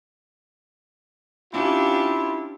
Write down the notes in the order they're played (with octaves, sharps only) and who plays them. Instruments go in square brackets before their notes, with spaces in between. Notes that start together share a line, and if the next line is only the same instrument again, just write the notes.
[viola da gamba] C#4 D4 G4 [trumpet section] E4 F4